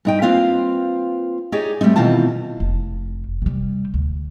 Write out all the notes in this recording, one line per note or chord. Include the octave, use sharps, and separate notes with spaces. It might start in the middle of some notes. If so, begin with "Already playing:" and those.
G2 D#4 G5
A#3 C4 F4 B4 C5 F5
D#4 G4 G#4 C#5 D5
G2 G3 A3 C4 D#4
B2 D#3 E3 C4 F4 A5
F1
C3 G3
D2